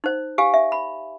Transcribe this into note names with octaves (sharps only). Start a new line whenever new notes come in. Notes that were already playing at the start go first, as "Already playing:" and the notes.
D#4 C5
G4 F5 G#5
E5
B5